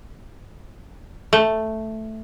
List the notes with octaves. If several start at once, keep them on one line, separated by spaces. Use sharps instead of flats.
A3